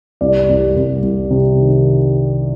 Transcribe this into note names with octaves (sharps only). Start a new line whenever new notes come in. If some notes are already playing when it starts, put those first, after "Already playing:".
C2 D5
C2
C2
C2
C3
D#3